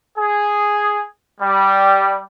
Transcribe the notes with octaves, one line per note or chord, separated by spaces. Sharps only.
G#4
G3